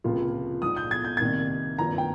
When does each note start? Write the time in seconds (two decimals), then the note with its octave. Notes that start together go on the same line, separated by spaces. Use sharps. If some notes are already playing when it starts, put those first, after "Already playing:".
0.04 C#2 C3 F3 A#3 F4
0.62 A#1 G#2 F3 D#6
0.77 G6
0.91 G#6
1.05 G6
1.17 C2 C3 D#3 A#3 G#6
1.79 G#1 G2 F3 A#3 A#5
1.98 G5